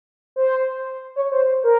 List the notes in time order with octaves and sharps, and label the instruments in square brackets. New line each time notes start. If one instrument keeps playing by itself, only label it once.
[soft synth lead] C5
C#5
C5
A#4